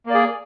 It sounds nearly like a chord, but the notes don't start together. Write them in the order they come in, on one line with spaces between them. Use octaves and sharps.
A#3 D5 G#4